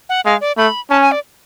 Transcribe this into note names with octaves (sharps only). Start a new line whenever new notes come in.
F#5
G#3 F5
D5
A3 B5
C#4 A5
G#5
D5